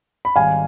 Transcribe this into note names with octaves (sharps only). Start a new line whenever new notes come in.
B5
G#1 G#2 G3 F5 G#5